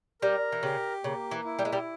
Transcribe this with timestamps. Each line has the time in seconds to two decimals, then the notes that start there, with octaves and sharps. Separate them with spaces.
0.22 G3 A#4
0.52 E3
0.63 C#3 G4
1.04 C#3 A#3
1.31 E3
1.45 E4
1.59 G3
1.65 G#3
1.73 G3